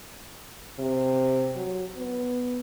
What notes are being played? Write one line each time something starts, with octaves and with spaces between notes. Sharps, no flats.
C3
F#3
B3